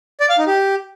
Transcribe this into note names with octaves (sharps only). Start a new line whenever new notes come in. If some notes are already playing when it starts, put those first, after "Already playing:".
D5
F5
D#4
G4